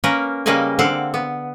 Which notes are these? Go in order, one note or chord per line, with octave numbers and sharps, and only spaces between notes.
A#3 C#4 A#4 B4
C#3 G3 A#3 B4 D#5 G#5
D3 C4 F5 F#5
B3